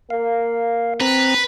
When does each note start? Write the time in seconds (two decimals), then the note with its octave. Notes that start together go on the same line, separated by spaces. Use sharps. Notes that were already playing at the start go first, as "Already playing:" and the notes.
0.10 A#3 F5
1.01 C4 B4 A#5